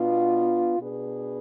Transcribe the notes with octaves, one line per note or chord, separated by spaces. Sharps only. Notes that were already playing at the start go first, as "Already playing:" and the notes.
Already playing: B2 B3 D4 F4
B2 B3 D4 G#4 B4